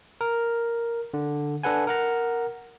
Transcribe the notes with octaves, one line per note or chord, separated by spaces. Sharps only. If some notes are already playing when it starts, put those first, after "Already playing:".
A#4
D3
D4 A4 B4 F#5 G#5
A#4 F#5 A#5